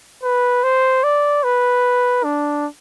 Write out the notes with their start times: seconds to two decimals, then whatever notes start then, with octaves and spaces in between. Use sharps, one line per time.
0.23 B4
0.63 C5
1.04 D5
1.44 B4
2.24 D4